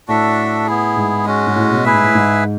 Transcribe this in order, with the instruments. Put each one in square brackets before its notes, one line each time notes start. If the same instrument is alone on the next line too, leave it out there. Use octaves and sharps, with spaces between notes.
[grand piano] A2 [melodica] D4 F#4 A4 E5
[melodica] B3 E4 G#4
[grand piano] G#2
[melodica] G#3 C#4 F#4
[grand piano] G#2
A2
B2
[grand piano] A2 [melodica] E4 G#4 B4 E5
[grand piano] G#2
A2
G#2